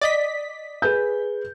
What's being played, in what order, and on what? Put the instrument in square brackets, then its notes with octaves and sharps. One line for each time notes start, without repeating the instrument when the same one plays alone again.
[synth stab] D5 D#5 B6
[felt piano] G#4 B4 G6